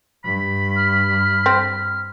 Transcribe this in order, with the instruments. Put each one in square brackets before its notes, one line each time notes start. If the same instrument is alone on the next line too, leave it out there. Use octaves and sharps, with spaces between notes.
[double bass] G2 [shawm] B5
[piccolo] F6
[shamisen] C4